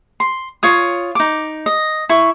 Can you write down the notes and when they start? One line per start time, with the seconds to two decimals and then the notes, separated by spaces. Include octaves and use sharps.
0.20 C6
0.63 F4 C#5 D#6
1.15 D#4 D6
1.66 D#5
2.09 E4 C#6